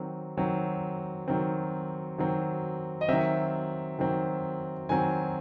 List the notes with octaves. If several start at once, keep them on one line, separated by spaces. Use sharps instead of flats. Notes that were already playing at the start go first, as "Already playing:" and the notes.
Already playing: D#3 F#3 C4
D#3 F#3 C4
D#3 F#3 C4
D#3 F#3 C4
D#5
D#3 F#3 C4 E5
D#3 F#3 C4
D#3 F#3 C4 G#5